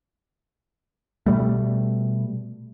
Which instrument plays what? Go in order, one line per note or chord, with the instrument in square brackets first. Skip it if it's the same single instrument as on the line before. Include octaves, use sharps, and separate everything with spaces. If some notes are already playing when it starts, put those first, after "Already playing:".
[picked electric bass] B2 G3 A3